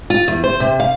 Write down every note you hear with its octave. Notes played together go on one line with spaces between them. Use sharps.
F4
E2
C5
C3
F5